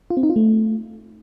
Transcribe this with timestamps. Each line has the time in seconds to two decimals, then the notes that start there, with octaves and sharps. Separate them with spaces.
0.10 F4
0.17 C4
0.23 D#4
0.30 F4
0.36 A3